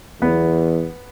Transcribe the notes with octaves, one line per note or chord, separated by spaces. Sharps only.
E2 B3